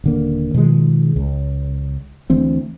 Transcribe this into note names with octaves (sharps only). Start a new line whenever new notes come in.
D#1 D3 A#3
B2 D#3 F3 G#3
C#2
D2 E3 C4